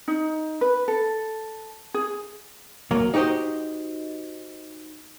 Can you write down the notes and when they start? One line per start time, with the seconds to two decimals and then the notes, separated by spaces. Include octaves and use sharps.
0.08 D#4
0.61 B4
0.88 A4
1.94 G#4
2.91 D2 F#3 A#3
3.14 D#4 F#4 G4 C5 D#5